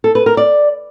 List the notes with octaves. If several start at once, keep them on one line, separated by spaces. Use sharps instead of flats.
A4
B4
A#4
D5